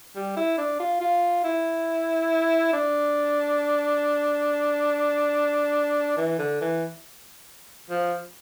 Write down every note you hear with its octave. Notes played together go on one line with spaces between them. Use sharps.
G3
E4
D4
F4
F4
E4
D4
E3
D3
E3
F3